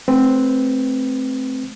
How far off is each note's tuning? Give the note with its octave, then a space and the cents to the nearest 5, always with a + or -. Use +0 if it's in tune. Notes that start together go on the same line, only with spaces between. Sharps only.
A3 -25 C4 +0 B4 +0